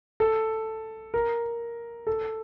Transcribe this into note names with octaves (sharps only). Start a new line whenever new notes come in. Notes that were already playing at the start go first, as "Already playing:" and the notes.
A4
A#4
A4